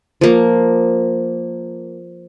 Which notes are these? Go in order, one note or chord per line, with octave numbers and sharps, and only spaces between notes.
F3 A#3